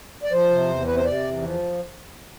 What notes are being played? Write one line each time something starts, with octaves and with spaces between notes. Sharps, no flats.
D5
F3 C5
C3
E2
C3 B4
C5
C3 D5
E2
F3